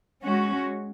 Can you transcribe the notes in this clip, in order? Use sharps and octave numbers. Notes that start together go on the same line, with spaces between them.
G#3 C#4 F#4